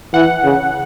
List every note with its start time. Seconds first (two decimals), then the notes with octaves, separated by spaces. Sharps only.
0.14 E3 F#5
0.44 C#3